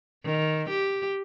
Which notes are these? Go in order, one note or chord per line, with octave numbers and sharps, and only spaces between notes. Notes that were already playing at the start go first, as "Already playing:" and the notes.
D#3
G4